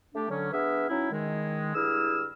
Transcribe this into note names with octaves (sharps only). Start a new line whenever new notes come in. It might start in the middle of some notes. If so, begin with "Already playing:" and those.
A3 D4 G4
D3 F#3 C#4
B3 D4 G#4 B4 E5 F6
F#3 C#4 D#4 E4
D#3 G#3
G2 E4 G#4 E6 F6